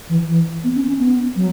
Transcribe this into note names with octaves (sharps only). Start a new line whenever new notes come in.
E3
E3
B3
C#4
C#4
B3
F#3